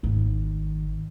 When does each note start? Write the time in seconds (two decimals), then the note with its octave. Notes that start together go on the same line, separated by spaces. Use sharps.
0.03 G#1 D#3